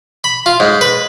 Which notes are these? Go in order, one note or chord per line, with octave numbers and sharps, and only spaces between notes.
B5
F4
G#2
B4